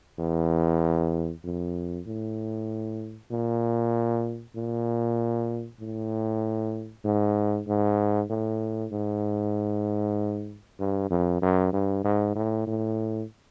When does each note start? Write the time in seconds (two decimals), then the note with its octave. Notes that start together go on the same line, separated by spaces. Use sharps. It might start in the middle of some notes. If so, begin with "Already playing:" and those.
0.19 E2
1.44 F2
2.06 A2
3.31 A#2
4.55 A#2
5.80 A2
7.05 G#2
7.67 G#2
8.30 A2
8.92 G#2
10.79 G2
11.10 F2
11.42 F#2
11.73 G2
12.04 G#2
12.35 A2
12.67 A2